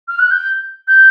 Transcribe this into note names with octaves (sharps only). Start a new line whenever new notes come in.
F6
F#6
G6
G6